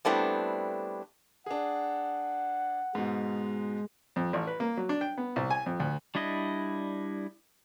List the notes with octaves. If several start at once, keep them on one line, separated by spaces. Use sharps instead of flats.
G3 A3 B3 C4 D4 E4
D4 G#4 F#5
G#2 B2 G#3
F2
A1
B4
A#3
F#3
D4
G5
B3
C2
G#5
F2
D2
G3 D4 E4 D#5